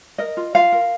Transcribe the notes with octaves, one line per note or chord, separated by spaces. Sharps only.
A#4 D#5
F4
F4 F5
A#4